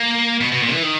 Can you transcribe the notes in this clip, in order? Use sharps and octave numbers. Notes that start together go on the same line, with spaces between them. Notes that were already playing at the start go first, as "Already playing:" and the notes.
Already playing: A#3
B2
B2
A#2
E3
D#3